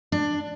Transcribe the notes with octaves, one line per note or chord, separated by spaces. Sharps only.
D4